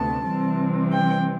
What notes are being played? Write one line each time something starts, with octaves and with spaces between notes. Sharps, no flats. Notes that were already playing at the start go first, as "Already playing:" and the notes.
Already playing: D2 C3 B3 A5
C3 E3 G3 C4
G5